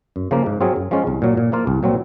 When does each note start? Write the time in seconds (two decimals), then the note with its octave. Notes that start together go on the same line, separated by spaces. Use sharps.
0.16 F#2
0.31 C#3 F3 A#3
0.46 G#2
0.61 F#3 C4 F4 G#4
0.76 F#2
0.91 F3 G#3 C#4 F4
1.07 C2
1.22 A#2 F#3
1.37 A#2
1.52 F3 A#3 F4
1.67 C2
1.83 A#2 F#3 C4